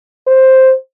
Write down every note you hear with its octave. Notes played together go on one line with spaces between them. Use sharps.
C5